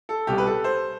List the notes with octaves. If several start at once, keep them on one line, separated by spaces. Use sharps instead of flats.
A4
C2 B2 G4
B4
A4
C5